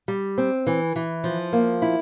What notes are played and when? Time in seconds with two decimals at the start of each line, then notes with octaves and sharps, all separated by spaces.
0.08 G3
0.38 C4
0.67 E3
0.96 E3
1.24 F3
1.53 A#3
1.82 E4